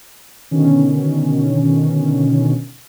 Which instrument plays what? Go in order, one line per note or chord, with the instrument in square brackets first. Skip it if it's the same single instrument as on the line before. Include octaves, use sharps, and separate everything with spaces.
[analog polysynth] B2 D3 D#3 C#4